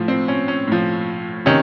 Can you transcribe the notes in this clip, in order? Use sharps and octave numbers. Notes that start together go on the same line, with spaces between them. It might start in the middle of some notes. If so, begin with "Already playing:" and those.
Already playing: A2 F3
C4
C#4
C#4
A2 F3
C3 D#3 C#4